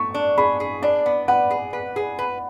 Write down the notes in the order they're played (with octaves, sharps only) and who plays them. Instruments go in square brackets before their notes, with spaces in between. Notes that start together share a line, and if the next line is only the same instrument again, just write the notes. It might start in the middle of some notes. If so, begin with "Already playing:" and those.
Already playing: [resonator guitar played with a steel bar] A3 [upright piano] C#6
[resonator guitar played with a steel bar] D4
[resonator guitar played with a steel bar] G#4 [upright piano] B5
[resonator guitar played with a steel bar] G#4
[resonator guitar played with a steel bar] D4 [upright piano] D5
[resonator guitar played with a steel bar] B3
[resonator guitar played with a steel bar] B4 [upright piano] F#5
[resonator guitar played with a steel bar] G#4
B4
G#4
B4